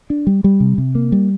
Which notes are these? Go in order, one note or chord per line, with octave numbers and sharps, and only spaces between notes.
D4
G3
G3
C3
C3
A#3
G3